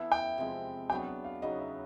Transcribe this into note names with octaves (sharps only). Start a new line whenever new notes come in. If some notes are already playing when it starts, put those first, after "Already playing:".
Already playing: E3 B3 E4 A4
G5
C3 F3 G#3
F#3 B3 D4 G5
F#5
F5
C#3 F#3 B3 D#4 D#5
E5